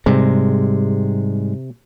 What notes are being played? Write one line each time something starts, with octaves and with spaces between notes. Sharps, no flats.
G#2 C3 G3 G#3